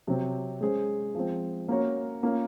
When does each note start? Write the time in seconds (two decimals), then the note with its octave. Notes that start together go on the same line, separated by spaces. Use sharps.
0.07 C3 F#3 C4
0.61 G#3 C#4 G#4 C5
1.15 F3 G#3 C4
1.69 A#3 C#4 F#4 A#4 C#5
2.23 A#3 C#4 F4